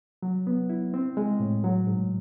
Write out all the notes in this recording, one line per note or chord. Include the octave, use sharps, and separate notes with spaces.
F#3
B3
E4
C4
G#3
A2
F#3
G#2